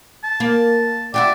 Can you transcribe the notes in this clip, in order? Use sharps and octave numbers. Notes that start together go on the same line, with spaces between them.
A5
A#3
E4 F#4 G4 D5